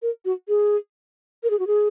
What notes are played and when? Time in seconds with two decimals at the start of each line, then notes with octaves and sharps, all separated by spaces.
0.02 A#4
0.25 F#4
0.48 G#4
1.43 A#4
1.50 G#4
1.59 F#4
1.67 G#4